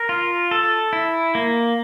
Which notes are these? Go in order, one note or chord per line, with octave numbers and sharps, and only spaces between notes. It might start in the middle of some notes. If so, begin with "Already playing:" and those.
Already playing: A#4
F4
A4
E4
A#3